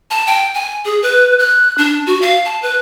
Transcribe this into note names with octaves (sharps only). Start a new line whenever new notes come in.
A5
G5
G#5
G#4
B4
F#6
D4
F#4
F5
A5
B4